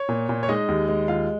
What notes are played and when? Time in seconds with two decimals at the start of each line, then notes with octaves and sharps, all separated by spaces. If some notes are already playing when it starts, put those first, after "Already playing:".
Already playing: C#5
0.09 A#2
0.29 A#2
0.43 C#5
0.49 G#3 D#4 D#5
0.68 D#2
0.89 G#3
1.08 D#2 F4 F5